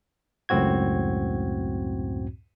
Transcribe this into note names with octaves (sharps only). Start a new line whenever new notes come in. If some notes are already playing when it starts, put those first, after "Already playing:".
C#2 F#2 A2 C4 F#4 G#6